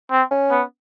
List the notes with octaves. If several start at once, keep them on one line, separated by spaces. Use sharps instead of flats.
C4
C#4
B3